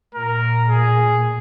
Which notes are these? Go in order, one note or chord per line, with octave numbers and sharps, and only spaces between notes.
A#2 A#4
G#4